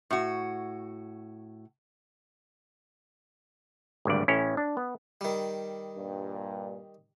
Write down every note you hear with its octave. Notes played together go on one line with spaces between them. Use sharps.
A2 F#4
G#1 D2 G2 D5
A1 C#4 E4 C#5
D4
B3
D#3 G3
G2 A#2